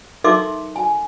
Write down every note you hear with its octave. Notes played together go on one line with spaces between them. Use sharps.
D#4 A4 A#4 E5 C6 D6
G#5